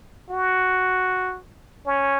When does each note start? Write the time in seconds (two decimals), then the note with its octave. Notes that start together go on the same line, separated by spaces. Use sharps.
0.29 F#4
1.86 C#4